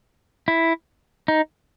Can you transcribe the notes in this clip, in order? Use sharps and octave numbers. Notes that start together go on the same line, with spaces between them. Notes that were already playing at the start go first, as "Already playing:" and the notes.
E4
D#4